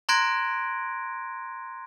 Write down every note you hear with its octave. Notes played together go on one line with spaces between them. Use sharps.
A#5 C6 F#6 G#6 A#6 D7